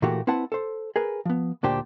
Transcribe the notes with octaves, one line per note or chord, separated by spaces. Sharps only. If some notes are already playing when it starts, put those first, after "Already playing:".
A#2 E3 A3 A#3 F#4 G4
C4 E4 B4 F#5 A5
A4 C5
G#4 A#4 B4
F3 B3
D2 A#2 D4 G4 C5